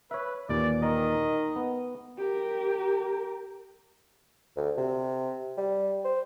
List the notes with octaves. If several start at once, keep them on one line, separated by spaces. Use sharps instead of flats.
B4 C#5 E5
D#2 A#2 E3 D5
D#3 D#5
B3
G4 A#4
D2
C3
G3
C5